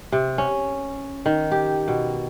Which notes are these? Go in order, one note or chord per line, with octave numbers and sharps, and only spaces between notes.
C3
C#4
D#3
G4
B2